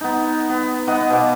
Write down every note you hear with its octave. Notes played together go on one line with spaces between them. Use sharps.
B3 D#4
B3
B3 D#4 D#5 F#5
B2 F5 D6